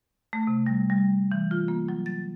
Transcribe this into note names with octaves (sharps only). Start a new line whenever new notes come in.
A3
C3
G3
G3
E3
F4
A#3
F#3
A6